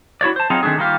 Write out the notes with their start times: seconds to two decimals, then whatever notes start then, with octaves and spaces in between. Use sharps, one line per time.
0.21 E4 F#4 C#5 D5
0.36 C5 A5
0.50 F#3 C4 D#4 F4 G#4
0.63 D#3 A3 C4 D4 G#4
0.78 D#3 G3 A#3 C4 F4 G4